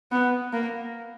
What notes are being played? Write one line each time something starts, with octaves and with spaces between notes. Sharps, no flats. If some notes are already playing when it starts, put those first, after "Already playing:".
B3
A#3